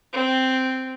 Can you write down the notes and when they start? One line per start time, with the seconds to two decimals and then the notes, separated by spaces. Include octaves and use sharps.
0.13 C4